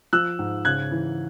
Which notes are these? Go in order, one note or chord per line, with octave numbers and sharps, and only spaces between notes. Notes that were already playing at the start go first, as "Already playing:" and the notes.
F3 E6 F#6
G#2
C#3 F#6 G#6
E3